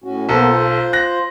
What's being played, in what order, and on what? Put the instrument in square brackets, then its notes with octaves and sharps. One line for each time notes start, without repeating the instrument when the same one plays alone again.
[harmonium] A2 C#4 F#4
[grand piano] B1 A4 [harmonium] A#3 B3 C5
[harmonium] F4 C5
[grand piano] F#6 A#6